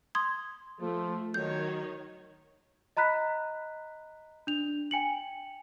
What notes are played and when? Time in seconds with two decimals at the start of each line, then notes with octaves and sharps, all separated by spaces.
0.15 C6 D#6 G#6
0.81 F3 A3
1.34 D#3 F#3 C#5 G6
2.97 D#5 A#5 B5 F#6 B6
4.47 D4 F7
4.91 G5 G#5 C#7 F#7